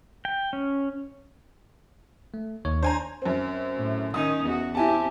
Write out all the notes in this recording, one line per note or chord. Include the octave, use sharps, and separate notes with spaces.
G5
C#4
A3
D#2 D#3 C#5
D4 C5 G#5 A#5
F#2 C4
A2
D#3 C#4 D#4 D#6
E2 F#4
C4 E4 G4 G#5 A5